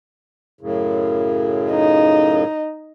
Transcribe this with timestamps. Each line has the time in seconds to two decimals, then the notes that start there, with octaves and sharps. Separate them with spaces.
0.61 F#2 A2 C#3
1.71 D#4